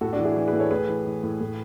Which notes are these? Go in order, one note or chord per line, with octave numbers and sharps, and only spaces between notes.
A2 F#4 A4
D4 F#4
E3
E4 G#4
E3
G#4 B4
A2
A4 C#5
A2 G#4 B4
E3
E3
A2
A2